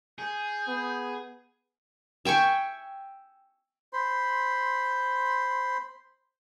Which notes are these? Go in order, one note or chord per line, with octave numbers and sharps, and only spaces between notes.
G#4 G6
B3
E5 G5 G#5 C#6
C5 B5 C6